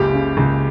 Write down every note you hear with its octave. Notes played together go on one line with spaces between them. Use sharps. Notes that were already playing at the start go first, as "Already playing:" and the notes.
Already playing: F#1 C#2 G4
C#3
C#2